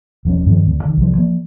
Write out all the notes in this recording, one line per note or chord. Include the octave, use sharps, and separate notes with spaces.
E1 F3 C4 C#4
G2 D#3 F3 C4
D2
D3 D#3
C2 F3
F3 A#3